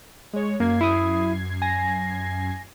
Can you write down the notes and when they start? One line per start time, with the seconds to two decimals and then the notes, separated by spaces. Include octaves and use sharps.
0.33 G#3 C#5
0.60 F#2 A#3 G#6 C7
0.81 E4 D#6
1.62 G#5 A#6